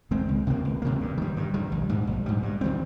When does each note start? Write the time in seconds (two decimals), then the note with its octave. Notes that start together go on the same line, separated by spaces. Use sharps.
0.11 D#3 G#3 C4
0.28 C#2
0.47 C3 D#3 A#3
0.65 C#2
0.82 C3 D#3 A#3
1.01 G2
1.18 D#3 G3
1.37 G2
1.54 D#3 G3
1.72 A#1
1.89 G#2 G3
2.07 A#1
2.26 G#2 G3
2.43 G2
2.61 D#3 G3 C4